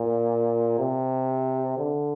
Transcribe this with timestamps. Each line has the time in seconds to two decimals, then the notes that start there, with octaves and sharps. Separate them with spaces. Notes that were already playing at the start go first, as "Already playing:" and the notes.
Already playing: A#2
0.79 C3
1.78 D3